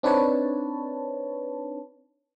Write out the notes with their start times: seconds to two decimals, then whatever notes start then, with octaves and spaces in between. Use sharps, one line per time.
0.03 C4 D4 D#4 B4 C#5 A5